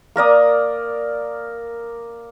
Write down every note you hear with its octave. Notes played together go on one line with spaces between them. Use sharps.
A#3 A#4 D5 D#6